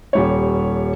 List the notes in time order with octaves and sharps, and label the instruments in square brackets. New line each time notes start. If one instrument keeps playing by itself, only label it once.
[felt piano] D#1 G3 C#5